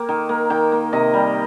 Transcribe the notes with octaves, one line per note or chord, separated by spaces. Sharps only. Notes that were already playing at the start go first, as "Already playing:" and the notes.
Already playing: A#3 G5
D#3
A#3
D#3 G5
A#3
C3 D#5
G3